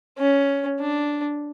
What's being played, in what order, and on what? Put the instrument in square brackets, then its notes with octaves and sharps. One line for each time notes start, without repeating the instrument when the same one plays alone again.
[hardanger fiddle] C#4
D4